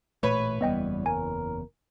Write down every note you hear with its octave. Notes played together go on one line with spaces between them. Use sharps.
A1 A#2 A3 B4 C#5
F#1 E2 G3 B3 D#5 G5
A#4 G#5